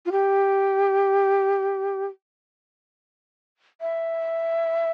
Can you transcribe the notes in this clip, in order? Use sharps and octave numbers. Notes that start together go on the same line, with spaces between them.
F4
G4
E5